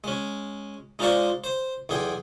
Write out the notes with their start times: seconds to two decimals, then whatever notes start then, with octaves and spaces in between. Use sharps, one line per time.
0.04 G#3 C#4
0.99 G#3 D#4 F4 C5 D5 C#6
1.44 C5
1.89 B1 E2 G#4 G5